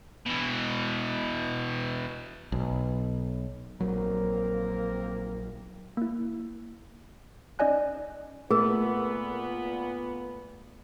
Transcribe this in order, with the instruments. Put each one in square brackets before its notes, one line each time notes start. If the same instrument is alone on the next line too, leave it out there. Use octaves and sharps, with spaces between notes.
[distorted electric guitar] B2 E3
[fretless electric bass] B1
[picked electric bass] A#1 F#3 [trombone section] A#3 C4 A#4
[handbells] A#3 E4
C#4 D#4 D5 D#5 G#5 F#6
[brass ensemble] A#2 B3 [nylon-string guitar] A3 [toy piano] G#4 A#4